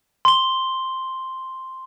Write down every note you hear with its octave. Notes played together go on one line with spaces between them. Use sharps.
C6 G7